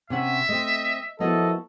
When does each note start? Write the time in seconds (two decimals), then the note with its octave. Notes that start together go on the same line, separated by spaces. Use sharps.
0.10 C3 C#4 E5 F#5
0.49 A3 C4 D#5
1.20 F3 A#3 B3 E4 F#4 A4 D#5